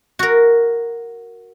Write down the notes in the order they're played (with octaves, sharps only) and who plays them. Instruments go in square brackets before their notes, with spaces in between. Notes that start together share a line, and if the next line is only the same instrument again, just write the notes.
[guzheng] F#4 A#4